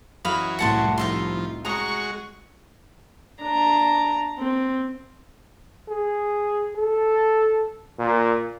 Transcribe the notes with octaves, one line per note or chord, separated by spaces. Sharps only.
F#2 E3 F#3 D#5 F5 B5
C2 A2 F#5 A5 C6
F3 D#4 E5 C6
G#3 F#4 A#5 C#6 D#6
D4 A#5
C4
G#4
A4
A#2